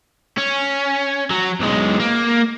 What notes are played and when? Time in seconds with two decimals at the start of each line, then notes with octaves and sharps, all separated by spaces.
0.38 C#4
1.31 F#3
1.61 B1 G#3
2.00 A#3